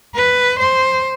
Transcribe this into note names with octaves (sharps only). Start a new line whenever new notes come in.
B4
C5